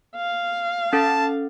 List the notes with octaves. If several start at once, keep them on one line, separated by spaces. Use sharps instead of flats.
F5
C#4 A4 A5 A6